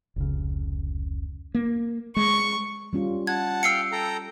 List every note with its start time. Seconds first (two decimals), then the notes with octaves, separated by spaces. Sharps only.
0.16 F1 C#2 C#3
1.55 A#3
2.17 G#3 C#6
2.93 G3 C#4 F4
3.27 F#5 A5 G#6
3.63 F5 G5 E6 C7 C#7
3.92 A4 G5 A#5